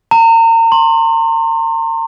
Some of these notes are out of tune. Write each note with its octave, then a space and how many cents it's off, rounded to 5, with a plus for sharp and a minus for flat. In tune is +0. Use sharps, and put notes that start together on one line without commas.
A#5 -35
C6 +25